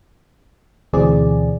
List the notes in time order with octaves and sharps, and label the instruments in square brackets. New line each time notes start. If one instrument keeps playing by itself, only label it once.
[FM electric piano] D2 B2 E3 C4 G#4 D5